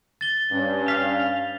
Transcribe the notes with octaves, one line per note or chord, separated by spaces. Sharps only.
A6 G7
G2 C#4
F5 B6